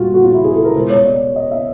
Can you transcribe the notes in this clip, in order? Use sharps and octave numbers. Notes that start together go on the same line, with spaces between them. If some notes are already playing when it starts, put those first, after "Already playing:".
Already playing: A#2 G3 F4 F#4
F#4
F4
E4
G#4
A4
A#4
B2 G#3 C5
C#5
D5
D#5
E5